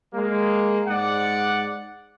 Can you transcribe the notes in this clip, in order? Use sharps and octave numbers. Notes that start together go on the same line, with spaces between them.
G#3 A#3
G#2 D5 F#5